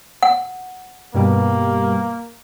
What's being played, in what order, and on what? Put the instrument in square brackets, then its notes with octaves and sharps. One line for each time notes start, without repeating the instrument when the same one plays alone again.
[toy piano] F#5
[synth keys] G2 B2 G3 [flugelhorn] A#3